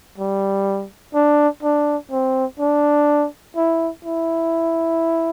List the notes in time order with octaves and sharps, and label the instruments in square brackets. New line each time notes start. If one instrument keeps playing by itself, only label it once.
[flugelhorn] G3
D4
D4
C4
D4
E4
E4